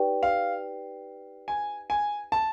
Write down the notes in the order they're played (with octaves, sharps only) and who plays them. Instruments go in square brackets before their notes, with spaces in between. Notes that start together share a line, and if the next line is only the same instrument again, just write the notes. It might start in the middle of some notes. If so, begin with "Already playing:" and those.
Already playing: [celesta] D#4 G4 B4 D5 G5
[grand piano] F5
G#5
G#5
A5